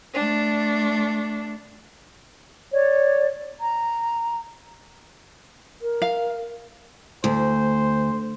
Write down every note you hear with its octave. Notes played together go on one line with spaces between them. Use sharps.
A3 D4
C#5 D5
A#5
A#4
F5
D2 C5